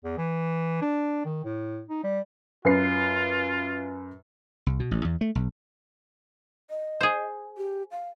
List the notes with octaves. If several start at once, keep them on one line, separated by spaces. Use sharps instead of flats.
E2
E3
D4
D#3
A2
D#4
G3
F#2 F4 B4 C7
C2
B2
A1
E2
A3
B1
D#5
G#4 C5
G4
F5